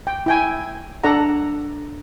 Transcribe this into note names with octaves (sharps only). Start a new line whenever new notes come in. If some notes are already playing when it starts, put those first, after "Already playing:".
G5
E4 G5 G#5
D4 A4 D5 F#5 A#5